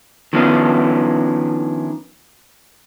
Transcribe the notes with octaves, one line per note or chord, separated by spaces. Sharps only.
D#3 F3 B3 C#4 D4 E4